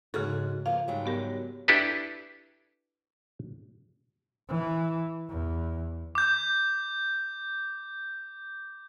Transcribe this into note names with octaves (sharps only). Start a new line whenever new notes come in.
G#2 C#3 F#4 G#4 A4
F3 A#3 F5
G#2 F#3 G3
B3 G4 A#4
D4 E4 G4 A4 B4
E3
E2
D6 G6